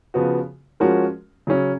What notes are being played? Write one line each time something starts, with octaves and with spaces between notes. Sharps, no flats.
C#3 F3 B3 F#4
F3 G#3 C#4 F#4 A#4
C#3 F#3 C#4